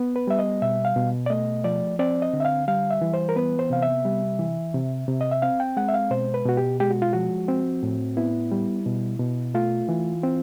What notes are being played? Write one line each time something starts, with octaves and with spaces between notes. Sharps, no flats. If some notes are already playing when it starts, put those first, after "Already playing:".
Already playing: B3
B4
G3 E5
D#5
B2 E5
F5
B2
D5
A3 D#5
F3 D5
C4 D5
D#5
D3
E5
F5
G3 F5
E5
E3
C5
A#4
B3 B4
C5
C3 F5
E5
G3
E3
C3
C3
D#5
E5
C4 F5
G5
G#3 F#5
E5
F5
B2 C5
B4
B2 F#4
G4
G#3 G4
F#4
F4
F3 F#4
C4
A2
B3 E4
G3
B2
B2
A3 F4
E3
C4